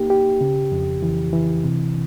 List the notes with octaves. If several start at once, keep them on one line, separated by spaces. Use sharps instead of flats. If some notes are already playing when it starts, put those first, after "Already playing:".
Already playing: A#3 D#4 G4
G4
C#3
F2
E3
E3
C3